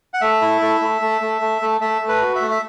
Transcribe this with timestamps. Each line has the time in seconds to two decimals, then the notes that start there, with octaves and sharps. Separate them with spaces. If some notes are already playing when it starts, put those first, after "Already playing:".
0.14 F#5
0.21 A3 E5
0.41 E4
0.61 A3
0.81 A3
1.01 A3
1.21 A3
1.41 A3
1.62 A3
1.81 A3 E5
2.02 A3
2.09 B4
2.21 F#4
2.35 E5
2.42 A3
2.51 E5